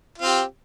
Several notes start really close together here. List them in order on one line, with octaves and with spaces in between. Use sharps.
F4 C4 G4